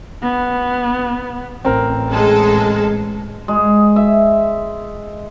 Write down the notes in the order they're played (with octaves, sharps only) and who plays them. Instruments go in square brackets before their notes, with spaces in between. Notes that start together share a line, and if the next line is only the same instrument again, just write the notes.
[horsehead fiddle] B3
[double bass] A1 [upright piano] C4 A#4
[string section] G#3 A4
[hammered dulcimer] G#3
E5